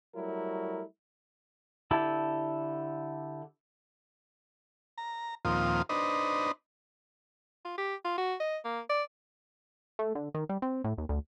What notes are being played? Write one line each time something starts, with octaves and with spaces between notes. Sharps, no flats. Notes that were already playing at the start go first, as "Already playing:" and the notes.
F#3 G3 A3 E4 A#4
D3 E4 G4 A4
A#5
D#2 A#2 F3 C4 F4 D#6
D4 D#4 B4 C5 D#5
F4
G4
F4
F#4
D#5
A#3
D5
A3
D3
D#3
G3
C4
A2
D#2
D2